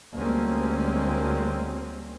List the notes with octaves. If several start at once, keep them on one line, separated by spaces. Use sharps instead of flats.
D2 G3 G#3 A#3 C4 C#4